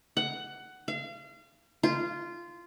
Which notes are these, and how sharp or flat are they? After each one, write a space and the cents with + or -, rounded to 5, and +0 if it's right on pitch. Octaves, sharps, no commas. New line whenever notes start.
F#5 +15
F5 -35
F4 -15